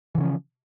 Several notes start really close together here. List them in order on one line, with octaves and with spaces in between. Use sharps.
E3 C#3 C#4 F3